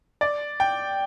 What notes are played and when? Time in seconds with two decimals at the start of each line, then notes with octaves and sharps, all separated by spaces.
0.21 D5
0.60 G5